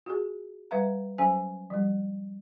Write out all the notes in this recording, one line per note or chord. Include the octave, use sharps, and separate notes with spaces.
F4 F#4 G#4
G3 B4 E5 F5 A#5
F#3 C#4 C5 G#5
F3 G3